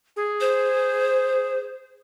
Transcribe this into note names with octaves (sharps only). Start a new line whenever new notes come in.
G#4
C5